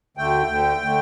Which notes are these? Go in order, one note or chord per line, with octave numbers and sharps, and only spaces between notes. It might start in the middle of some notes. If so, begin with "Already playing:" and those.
D2 D3 A3 G5
D2 D3 A3
D3 A3